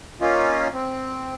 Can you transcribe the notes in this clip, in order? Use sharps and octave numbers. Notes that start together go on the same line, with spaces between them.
A#3 C#4 D#4 F4
C4